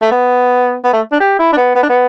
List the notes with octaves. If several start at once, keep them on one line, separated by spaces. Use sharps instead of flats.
A3
B3
B3
A3
D4
G4
E4
D4
B3
B3
D4
B3